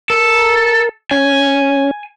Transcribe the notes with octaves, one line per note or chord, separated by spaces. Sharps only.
A4 A#4
C#4 G#5